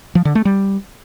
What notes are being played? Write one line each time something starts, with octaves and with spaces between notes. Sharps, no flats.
F3
D3
A3
G3